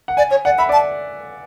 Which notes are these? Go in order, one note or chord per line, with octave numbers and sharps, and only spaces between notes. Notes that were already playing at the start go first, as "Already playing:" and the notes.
F#5
D5 G#5
C#5
D5 F#5
E5 B5
D5 A5